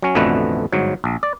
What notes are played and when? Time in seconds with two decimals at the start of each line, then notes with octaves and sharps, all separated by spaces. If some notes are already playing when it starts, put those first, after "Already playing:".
0.02 F#3 C#4
0.15 A1 F2 B2 D3 A3 B4
0.72 G1 G#2 F#3
1.04 A#1
1.23 D5